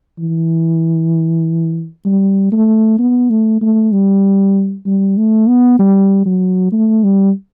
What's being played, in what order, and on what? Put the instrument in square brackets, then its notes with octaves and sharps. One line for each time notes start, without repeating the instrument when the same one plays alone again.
[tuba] E3
G3
A3
B3
A3
A3
G3
G3
A3
B3
G3
F#3
A3
G3